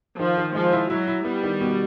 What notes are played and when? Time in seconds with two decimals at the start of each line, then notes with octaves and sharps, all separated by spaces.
0.19 D#3 F3
0.37 D#3
0.55 F3 G#3
0.73 E4
0.90 F#3 E4
1.07 E4
1.25 G3 B3
1.43 D#3
1.61 B2